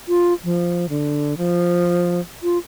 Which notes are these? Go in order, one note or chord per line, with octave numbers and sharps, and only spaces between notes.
F4
F3
D3
F3
F4